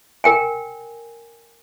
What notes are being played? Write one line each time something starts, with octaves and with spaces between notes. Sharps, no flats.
A#4 G5 G#5